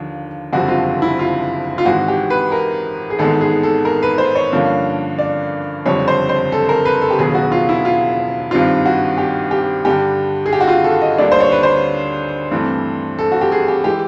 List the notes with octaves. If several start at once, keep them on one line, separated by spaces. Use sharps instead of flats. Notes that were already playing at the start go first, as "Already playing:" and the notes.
Already playing: D#2 D3 F3
F#1 F2 D3 G3 C4 F#4
F4
E4
F4
F4
G#1 G#2 E3 G#3 F#4
G4
B4
A#4
G#4
A1 G#2 D#3 G#3 B3 A4
G#4
A4
A#4
B4
C5
C#5
G2 D3 F3 A#3 C#4
D5
F#1 F2 D3 G3 C4 C#5
C5
C5
A4
A#4
B4
A4
G4
E1 D#2 C#3 F#3 B3 G#4
F#4
F4
E4
F4
G#1 G2 D#3 G3 C4 F4
F#4
G4
G4
G2 D3 G3 G4
G#4
G4
F#4
F4
A4
D#5
D2 D3 G3 A#3 D4 D5
C5
C#5
B4
C5
G2 E3 A3 C4
A4
F#4
G4
G#4
G4
E3 G#3 G4